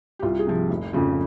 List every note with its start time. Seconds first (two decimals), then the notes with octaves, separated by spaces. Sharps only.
0.19 G4
0.22 C2 F4
0.39 G#4
0.47 C3 F3
0.70 F1
0.93 F2 C#3 F3